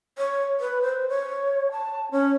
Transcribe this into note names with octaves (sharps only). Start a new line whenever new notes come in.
C#5
B4
C5
C#5
A5
C#4